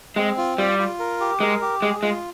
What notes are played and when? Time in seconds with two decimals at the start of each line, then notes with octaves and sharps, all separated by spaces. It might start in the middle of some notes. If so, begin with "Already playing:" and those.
0.16 G#3 C4
0.37 F4
0.58 G3 F4
0.79 F4
0.99 A#4
1.20 G4
1.40 G#3 A#4
1.62 G4
1.82 G#3 G#4
2.03 G#3 F4